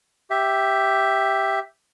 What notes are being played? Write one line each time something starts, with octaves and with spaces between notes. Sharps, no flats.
G4 E5